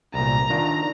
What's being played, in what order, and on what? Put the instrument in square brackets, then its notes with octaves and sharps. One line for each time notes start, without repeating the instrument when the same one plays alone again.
[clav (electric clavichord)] C2 A#2 [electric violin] A#5
[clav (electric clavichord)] D#3 D4 F4